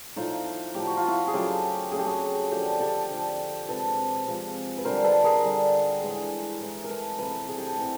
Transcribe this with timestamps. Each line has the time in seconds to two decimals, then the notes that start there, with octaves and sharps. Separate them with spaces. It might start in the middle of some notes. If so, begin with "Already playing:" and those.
0.16 A2 F3 A3 D#4 F4
0.75 A2 F3 A3 G4
0.87 F#4
0.97 F4
1.08 E4 F#4
1.27 G#4
1.33 C#3 F#3 A3 F4 G4
1.92 C#3 F#3 A3 G#4
1.99 G4
2.06 F#4 G#4
2.51 D3 F3 A3 G4 A4
2.80 G4 A4
3.10 D3 F3 A3
3.68 C3 F3 G#3 A4 B4
4.27 C3 F3 G#3
4.78 B4
4.85 D3 G3 A#4 C5
5.04 A4 B4
5.24 G#4 A#4
5.44 D3 G3
6.02 A2 E3 G#3
6.61 A2 E3 G#3
6.84 A#4
6.89 A4 B4
7.19 C3 E3 A3 A4 B4
7.48 G#4
7.58 G4 A4
7.77 C3 E3 A3